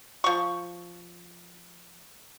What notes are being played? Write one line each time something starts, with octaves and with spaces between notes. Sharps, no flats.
F3 C#6